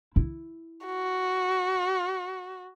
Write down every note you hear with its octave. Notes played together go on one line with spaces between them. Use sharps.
E4
F#4